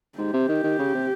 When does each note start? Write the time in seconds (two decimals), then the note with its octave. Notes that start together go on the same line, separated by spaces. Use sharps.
0.18 G#2 G4
0.33 C3
0.49 D#3
0.64 D#3
0.79 C#3
0.94 C3